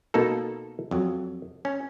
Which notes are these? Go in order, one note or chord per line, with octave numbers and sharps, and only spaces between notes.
B2 A#3 D#4 A4
F2 F#3
C#4